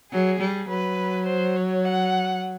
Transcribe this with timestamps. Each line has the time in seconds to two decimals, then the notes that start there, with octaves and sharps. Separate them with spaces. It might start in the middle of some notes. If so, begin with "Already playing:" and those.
0.11 F#3 G#4
0.40 G3
0.69 F#3 B4
1.27 C5
1.56 C#5
1.85 F#5